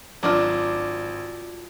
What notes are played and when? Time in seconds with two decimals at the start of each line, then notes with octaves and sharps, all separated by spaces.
0.23 G#1 F#3 D4 F4 D6